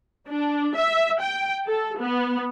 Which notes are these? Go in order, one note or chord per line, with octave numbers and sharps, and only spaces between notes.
D4
E5
G5
A4
B3